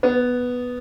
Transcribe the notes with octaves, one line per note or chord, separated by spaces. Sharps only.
B3